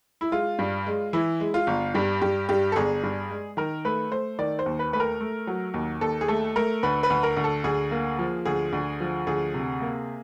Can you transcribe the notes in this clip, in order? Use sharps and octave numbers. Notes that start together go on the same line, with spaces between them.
E4
G#3 F4
G2
G#3
E3 E4
G#3
F4
G1
G2 G4
G2 G4
G2 G4
A4
G1 G#4
G2
G#3
D#3 A#4
A3 B4
A3 C5
D#3 D5
C5
D#2
B4
A3 B4
A#4
A3
F#3
D#2
D#2 A4
G#4
A3 A4
A3 A#4
D2 B4
B4
D2
A#4
D2
A4
D2 G#4
A#3
F3
D2 G#4
D2
F3
D2 G#4
C3
A#3